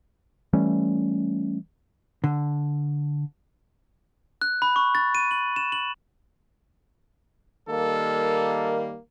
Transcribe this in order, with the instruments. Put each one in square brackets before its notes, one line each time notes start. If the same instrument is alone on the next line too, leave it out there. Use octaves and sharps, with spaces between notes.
[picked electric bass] E3 G3 A3 C#4
[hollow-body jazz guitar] D3
[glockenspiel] F#6
B5
C#6
A6
D#7
F#7
E7
F#7
[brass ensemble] D#3 G3 A#3 [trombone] A4